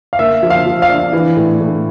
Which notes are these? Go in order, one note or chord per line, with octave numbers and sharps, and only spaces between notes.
F5
A#3 E5
F3
F5
F3
F5
D4
E3
A2
A2